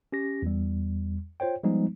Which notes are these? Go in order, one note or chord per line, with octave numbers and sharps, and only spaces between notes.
C#4 G4 A#6
E2 G3
F4 C5 C#5 G5
F3 G3 G#3 B3 D#4